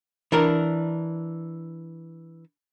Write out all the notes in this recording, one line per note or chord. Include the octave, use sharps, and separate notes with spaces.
E3 D4 A#4